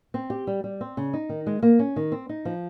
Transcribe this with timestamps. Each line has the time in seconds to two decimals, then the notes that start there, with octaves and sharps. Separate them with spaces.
0.14 C4
0.30 G4
0.47 G3
0.64 G3
0.81 C4
0.97 C#3
1.13 D#4
1.29 D#3
1.47 G#3
1.63 A#3
1.79 C#4
1.96 D#3
2.12 C4
2.29 D#4
2.45 F3